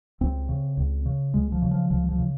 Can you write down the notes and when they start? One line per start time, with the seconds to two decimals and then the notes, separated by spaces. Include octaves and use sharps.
0.21 C#2 C4
0.49 C#3
0.77 C#2
1.06 C#3
1.34 C#2 G#3
1.52 F3
1.62 C#3
1.71 F3
1.90 C#2 F3
2.09 F3
2.18 C#3